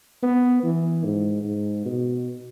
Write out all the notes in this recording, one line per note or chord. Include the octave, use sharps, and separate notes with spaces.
B3
E3
G#2
G#2
B2